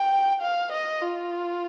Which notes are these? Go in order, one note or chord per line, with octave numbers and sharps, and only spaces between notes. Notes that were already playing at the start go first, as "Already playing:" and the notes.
Already playing: G5
F5
D#5
F4